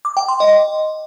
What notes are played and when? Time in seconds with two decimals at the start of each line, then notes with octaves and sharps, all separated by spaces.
0.05 D6
0.17 G5
0.28 C6
0.40 D#5